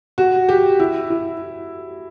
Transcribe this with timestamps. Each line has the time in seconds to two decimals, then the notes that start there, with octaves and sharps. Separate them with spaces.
0.18 F#4
0.49 G4
0.80 E4
1.10 E4